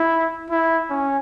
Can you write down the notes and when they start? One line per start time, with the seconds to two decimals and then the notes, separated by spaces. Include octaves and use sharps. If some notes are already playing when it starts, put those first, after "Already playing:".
Already playing: E4
0.50 E4
0.90 C#4